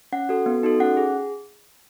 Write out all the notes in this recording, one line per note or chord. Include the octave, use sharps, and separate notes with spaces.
C#4 F#5
F#4 A4
B3
D#4 F#4 A4
C#4 F#5
G#4